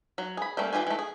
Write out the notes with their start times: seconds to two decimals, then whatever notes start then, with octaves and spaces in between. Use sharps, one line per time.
0.18 F#3
0.37 G#4 B5
0.57 G3 A3 A#3 C#4
0.73 E3 F#3 F4 G4 G#5
0.87 E3 A3
0.99 G#4